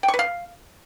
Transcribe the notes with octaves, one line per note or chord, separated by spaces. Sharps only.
G5
C#6
B4
F5